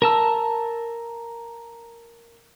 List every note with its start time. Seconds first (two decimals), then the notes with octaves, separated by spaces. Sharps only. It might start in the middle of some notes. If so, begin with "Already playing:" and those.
0.02 A#4 A5 E6